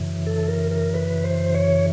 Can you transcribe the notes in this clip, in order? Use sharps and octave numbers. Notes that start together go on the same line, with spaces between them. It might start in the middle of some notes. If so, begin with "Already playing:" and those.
Already playing: F#2 C#3 E3
A4
A#4
A#4
B4
C5
C#5